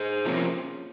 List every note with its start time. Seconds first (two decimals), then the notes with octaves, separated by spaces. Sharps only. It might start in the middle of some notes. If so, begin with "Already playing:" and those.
Already playing: G#4 C5
0.25 C3 F3 A#3 C#4